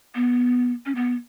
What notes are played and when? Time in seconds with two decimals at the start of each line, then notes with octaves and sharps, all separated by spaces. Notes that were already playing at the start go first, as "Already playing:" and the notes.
0.15 B3
0.86 C#4
0.95 B3